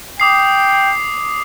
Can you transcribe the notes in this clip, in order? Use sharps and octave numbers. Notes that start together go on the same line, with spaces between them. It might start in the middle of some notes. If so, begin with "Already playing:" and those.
G5 D6 D#6 C7